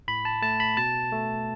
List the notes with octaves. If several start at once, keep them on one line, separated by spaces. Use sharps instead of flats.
A2 B5
A5
A3 A5
B5
B2 A5
A3